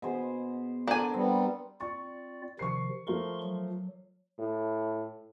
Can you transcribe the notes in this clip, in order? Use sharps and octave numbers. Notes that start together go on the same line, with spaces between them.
B2 G#4 C5
D3 D4 A#4 G#5
G3 B3 C4
C4 F4 D5 C#6
C3 D#3 F3 C#6 C7
F3 A3 A#4 C6 C#6
F#3
A2